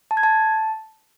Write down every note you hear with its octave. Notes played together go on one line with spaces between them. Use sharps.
A5
G#6
A5